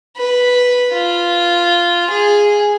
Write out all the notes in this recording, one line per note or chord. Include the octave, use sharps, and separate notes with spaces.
B4
F4
G#4